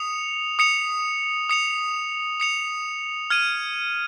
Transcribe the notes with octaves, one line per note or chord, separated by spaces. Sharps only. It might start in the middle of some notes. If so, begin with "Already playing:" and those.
Already playing: D#6 C#7 F7
D#6 C#7 F7
D#6 C#7 F7
D#6 C#7 F7
F6 G#6 D#7